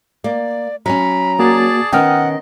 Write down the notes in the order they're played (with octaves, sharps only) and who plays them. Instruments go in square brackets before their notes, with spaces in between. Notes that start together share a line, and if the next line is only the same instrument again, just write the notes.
[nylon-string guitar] A#3 [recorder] D5
[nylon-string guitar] F#3 C#4 [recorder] A#5 [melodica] B5
[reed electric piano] A#3 F#4 [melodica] G#4 D5 A5
[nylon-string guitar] D#3 B3 C#4 [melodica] D#5 [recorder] F#5 [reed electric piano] G5 D#6 F6